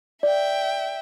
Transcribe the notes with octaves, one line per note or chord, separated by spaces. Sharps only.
D5 E5 G5